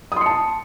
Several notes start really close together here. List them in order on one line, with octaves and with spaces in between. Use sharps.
D#6 C6 C#7 A5